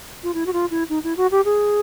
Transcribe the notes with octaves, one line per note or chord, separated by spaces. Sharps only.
F4
E4
F#4
F4
E4
D#4
E4
F#4
G4
G#4